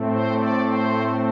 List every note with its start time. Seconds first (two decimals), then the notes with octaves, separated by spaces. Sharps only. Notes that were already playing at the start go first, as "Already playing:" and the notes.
Already playing: A2 A3 C4
0.08 C5
0.37 D5
0.65 C5